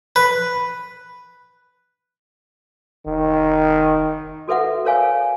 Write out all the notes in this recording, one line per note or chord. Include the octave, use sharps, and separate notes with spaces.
B4
F1 D#3
F#4 A4 B4 E5 F#5
A#4 B4 C#5 F5 G#5